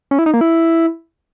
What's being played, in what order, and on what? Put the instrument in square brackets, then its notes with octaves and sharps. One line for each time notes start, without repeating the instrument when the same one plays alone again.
[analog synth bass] C#4
E4
D#4
A#3
E4